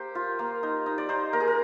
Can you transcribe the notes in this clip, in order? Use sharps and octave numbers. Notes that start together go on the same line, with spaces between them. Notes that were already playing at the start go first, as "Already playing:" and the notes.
Already playing: A#3 G4 C5
F4
A#3
D#4
D#4
D5
D#4 C5
A#3 A#4
G#4
A#4